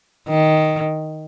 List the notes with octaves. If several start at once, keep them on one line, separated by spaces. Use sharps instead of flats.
D#3